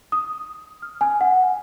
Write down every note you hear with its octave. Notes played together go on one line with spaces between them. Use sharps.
D#6
F6
G#5
F#5